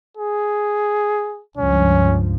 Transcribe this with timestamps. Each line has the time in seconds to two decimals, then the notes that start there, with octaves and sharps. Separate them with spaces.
0.17 G#4
1.57 C#2 G2 F3 C#4